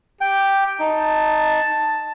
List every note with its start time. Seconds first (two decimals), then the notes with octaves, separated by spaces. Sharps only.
0.21 G4 G5
0.79 D#4 A5